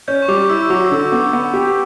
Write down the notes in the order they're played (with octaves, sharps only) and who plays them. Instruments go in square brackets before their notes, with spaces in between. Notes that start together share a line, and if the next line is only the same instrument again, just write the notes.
[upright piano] C#4 [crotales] G6
[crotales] C#6
[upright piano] G3 [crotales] D6
[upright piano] E4 [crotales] E6
[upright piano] F#3 [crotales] D6
[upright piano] D3
B3
B3
G4